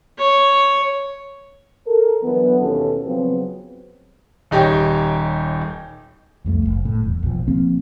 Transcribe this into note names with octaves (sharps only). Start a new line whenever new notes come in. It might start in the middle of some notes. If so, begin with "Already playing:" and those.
C#5
A4 A#4
D3 E3 F#3 B3
D#2 B2 C#4 E4 A4
C#3 F3 F#3 B3 C4
D#1 D#4 G4 C#5 G5
C2 F2 G3 A3
F#1
A2
D#1 E2
A#1 B2 F3
F3 A#3 C4